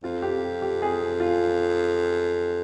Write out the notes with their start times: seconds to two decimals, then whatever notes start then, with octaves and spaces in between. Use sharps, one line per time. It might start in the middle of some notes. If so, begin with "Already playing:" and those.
0.03 F2 F4
0.22 G4
0.62 G4
0.82 G#4
1.20 F4